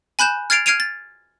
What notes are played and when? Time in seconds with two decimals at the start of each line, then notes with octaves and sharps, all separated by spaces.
0.19 G#5 B5 F#6 G6 E7
0.50 F6 G#6 A6 C7 D7 F7
0.66 F6 G#6 C7 D7 D#7 F7
0.80 A6